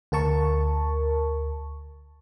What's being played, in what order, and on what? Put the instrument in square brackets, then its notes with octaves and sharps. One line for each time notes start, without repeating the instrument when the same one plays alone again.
[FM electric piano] D2 A#4 A5 C#6